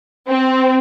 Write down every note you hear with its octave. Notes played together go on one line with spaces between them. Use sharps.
C4